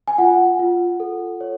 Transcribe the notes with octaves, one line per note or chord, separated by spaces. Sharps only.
G#5
F4 F#5
F4
A4
C#5